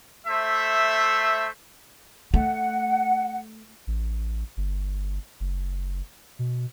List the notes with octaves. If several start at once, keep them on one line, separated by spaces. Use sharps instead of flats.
A3 C5 E5
A3 F#5
A1
G1
F#1
B2